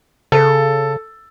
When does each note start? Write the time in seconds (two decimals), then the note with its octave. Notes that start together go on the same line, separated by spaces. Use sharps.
0.32 C#3 A4